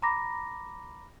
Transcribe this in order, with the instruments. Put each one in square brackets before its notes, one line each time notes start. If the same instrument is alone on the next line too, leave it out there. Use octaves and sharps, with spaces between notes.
[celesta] A#5 B5 D6 A#6